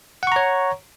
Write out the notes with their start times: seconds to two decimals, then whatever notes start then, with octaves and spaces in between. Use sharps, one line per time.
0.23 F#5
0.27 C#6
0.32 A#5
0.36 C#5